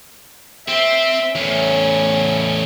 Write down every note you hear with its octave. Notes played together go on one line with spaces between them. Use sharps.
C4 E5
E2 A2 C#4